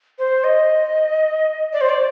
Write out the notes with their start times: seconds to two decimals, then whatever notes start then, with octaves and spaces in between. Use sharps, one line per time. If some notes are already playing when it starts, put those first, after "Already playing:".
0.18 C5
0.44 D#5
1.73 D5
1.81 C5
1.89 D5